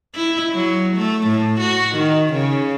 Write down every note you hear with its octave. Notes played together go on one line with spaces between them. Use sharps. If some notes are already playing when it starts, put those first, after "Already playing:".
E4
F#3
A3
A2
F#4
D#3
C#3